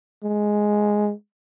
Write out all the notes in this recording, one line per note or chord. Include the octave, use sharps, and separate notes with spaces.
G#3